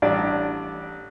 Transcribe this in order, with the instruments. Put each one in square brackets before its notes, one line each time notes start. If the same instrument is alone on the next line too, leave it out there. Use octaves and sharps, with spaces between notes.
[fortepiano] A1 G3 D4 D5